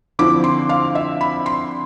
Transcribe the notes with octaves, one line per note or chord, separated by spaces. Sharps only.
D3 F3 C4 E4 D6
C6
F5
E5
B5
C6